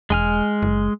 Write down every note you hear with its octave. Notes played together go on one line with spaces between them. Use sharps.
E1 G#3 G#5 F6
F#1